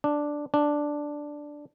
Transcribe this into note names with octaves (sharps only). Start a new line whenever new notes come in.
D4
D4